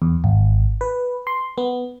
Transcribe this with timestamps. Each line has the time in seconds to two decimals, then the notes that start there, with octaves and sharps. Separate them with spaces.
0.02 E2
0.24 G#1
0.81 B4
1.27 C6
1.58 B3